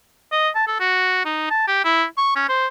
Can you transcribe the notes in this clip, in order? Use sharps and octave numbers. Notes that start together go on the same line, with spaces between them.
D#5
A5
A4
F#4
D#4
A5
G4
E4
C#6
C#4
C5